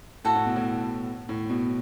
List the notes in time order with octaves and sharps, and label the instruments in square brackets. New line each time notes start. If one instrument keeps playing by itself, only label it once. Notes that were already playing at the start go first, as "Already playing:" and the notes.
[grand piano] A2 [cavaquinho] F#4 A4 F#5
[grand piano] A2
B2
A2
A2
B2